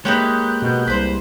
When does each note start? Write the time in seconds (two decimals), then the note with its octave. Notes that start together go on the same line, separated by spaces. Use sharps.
0.05 G#3 A#3 D#4 G4 B4 C#5 F#6 G6
0.62 B2
0.87 C2 B4 C5